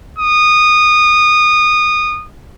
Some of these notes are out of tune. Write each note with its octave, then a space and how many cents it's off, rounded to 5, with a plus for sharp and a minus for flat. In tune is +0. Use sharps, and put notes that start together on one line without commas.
D#6 -20